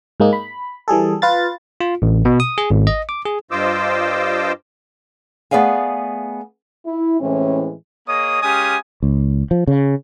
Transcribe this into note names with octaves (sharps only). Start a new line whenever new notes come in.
G#2 G#3 A#3 D#4
B5
E3 G3 G#4 A4
F4 B4 F5 A6
F4
A1
B2
D#6
G#4
G#1
D#5
D6
G#4
G2 F4 C5 D#5 D6 E6
A3 B3 G#4 D5 F5 G#5
E4
A2 E3 G#3 C4 C#4
A#3 G#4 C#5 D#5 D#6
G#3 C#4 G4 F5 G#5 D#6
C#2
F3
C#3